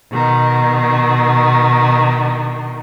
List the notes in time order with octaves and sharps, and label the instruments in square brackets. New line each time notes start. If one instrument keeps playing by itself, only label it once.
[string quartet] B2 D#3